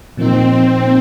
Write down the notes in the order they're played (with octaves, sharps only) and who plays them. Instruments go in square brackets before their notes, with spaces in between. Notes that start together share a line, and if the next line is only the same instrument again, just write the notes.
[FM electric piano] A#2 F3 A#3 D#4 [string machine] C4